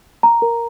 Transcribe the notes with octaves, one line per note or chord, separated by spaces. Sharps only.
A#5
A#4